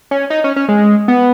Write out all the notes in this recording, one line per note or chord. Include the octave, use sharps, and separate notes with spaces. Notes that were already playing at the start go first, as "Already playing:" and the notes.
C#4
D#4
C#4
C#4
G#3
B3